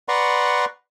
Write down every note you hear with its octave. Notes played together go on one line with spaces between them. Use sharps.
B4 D5 F#5 A#5 C6 C#6